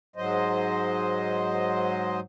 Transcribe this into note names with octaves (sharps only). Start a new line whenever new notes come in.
G#2 F#3 C5 D#5